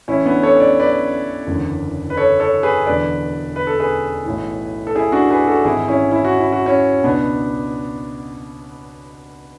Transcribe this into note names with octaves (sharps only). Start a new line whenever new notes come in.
A1 A2 E3 C#4 E4
B3 D4
A4 C#5
D5
B4 D5
F#1 E2 D3
B4
A4 C#5
A4 C#5
G#4 B4
E1 E2 D3 B4 D5
B4
A4
G#4 B4
B1 A2 E3
A4
E4 G#4
D4 F#4
G#4 B4
F#4 A4
G#1 G#2 E3 E4 G#4
C#4 E4
E4
F#4
E4
F#4
C#4 E4
C#2 B2 B3 D4